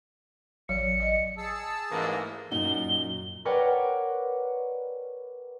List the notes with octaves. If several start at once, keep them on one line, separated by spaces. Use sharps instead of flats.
A1 F#3 C#5 D5 C#7
D5 D#5
G#4 A5 E6
A1 G#2 E3 A#3
F#2 A#2 D#4 F#4 G7
A#4 B4 C#5 D5 F#5 G5